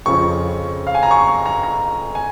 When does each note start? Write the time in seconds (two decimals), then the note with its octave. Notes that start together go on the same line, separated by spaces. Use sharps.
0.06 F2 C#3 F3 C#6
0.87 F5
0.95 G#5
1.03 A#5
1.11 C#6
1.28 C#6
1.46 A#5
1.63 A#5
2.15 G#5